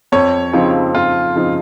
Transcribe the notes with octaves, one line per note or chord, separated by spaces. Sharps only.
F2 C#5
C#3 F3 C4 D#4
F2 F4
C#3 F3 C4 D#4